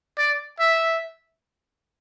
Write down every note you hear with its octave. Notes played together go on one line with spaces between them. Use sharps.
D5
E5